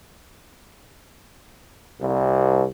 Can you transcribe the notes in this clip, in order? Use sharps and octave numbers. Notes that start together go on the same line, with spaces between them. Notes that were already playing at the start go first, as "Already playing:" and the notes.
C2